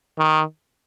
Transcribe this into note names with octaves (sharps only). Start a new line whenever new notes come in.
D#3